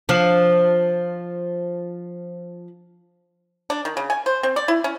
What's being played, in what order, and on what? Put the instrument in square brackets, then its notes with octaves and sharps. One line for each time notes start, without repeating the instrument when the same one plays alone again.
[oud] F3 D4
[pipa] D4
D#3
C#3
G#5
C5
C4
D5
E4
C#4